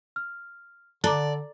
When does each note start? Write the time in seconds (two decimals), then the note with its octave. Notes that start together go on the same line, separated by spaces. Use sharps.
0.16 F6
1.04 D3 A4 D5 A5 A#5 D6